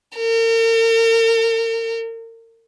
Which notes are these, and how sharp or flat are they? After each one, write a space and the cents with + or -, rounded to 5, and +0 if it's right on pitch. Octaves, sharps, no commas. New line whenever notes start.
A#4 -40